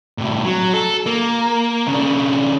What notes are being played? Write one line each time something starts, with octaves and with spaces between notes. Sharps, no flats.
A2 C3
F#3
A4
A#3
C#3 D4